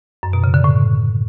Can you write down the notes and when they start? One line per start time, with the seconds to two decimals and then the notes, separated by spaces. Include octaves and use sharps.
0.23 F#2
0.33 B2
0.44 C#3
0.54 D3
0.64 A2